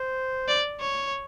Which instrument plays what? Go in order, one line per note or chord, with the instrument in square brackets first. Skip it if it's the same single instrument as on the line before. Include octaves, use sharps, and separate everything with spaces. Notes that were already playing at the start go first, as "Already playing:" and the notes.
Already playing: [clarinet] C5
[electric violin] D5
C#5